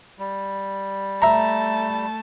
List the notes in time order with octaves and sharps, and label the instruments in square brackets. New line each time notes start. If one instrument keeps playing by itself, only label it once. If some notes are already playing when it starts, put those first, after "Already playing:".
[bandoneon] G3
[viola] A3 A5 [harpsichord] E5 A#5